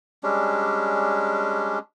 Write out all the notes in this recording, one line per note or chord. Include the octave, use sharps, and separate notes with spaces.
G3 G#3 C#4 D4